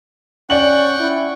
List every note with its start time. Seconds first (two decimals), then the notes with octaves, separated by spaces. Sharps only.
0.50 C#4 D5 F#5 G5 C#6 F#7
0.99 E4